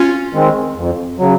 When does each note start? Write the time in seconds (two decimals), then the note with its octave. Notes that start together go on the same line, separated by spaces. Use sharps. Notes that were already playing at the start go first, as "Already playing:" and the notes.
Already playing: C#4 F4
0.33 D#3 G#3 C4
0.76 F2
1.19 C#3 F#3